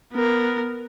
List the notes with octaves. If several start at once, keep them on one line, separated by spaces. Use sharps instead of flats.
B3 A#4